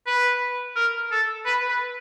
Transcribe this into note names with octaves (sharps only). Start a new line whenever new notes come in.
B4
A#4
A4
B4
B4